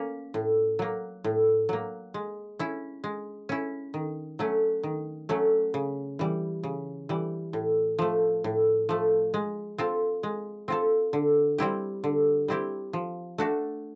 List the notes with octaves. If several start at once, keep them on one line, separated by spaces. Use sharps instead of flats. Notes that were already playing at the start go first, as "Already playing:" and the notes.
Already playing: A#3 C#4
A2
F#3 A#3
A2
F#3 A#3
G#3
C#4 E4
G#3
C#4 E4
D#3
F#3 A3 C#4
D#3
F#3 A3 C#4
C#3
E3 G3
C#3
E3 G3
A2
F3 A3
A2
F3 A3
G#3
C4 F4 A4
G#3
C4 F4 A4
D3
G3 C4 E4 G4
D3
G3 C4 E4 G4
F3
A3 D4 F#4 A4